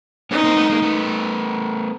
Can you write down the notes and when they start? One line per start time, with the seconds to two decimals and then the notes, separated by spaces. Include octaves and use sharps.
0.31 B3 C#4 D#4
0.44 A#3 C4
0.57 A3 B3
0.69 G#3 A#3
0.82 A3 B3